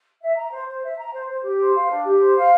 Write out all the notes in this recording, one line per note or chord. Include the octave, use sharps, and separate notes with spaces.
E5
A#5
C5
C5
E5
A#5
C5
C5
G4
C5
F5
D4
G4
C5
F5